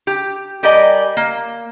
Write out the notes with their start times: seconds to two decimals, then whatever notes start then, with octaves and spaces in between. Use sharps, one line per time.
0.07 G4
0.63 G3 G4 A#4 D5 D#5 G#5
1.17 A#3